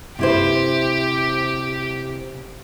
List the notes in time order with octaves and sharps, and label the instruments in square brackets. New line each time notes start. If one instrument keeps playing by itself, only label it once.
[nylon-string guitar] C3 E4 C5 [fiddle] G4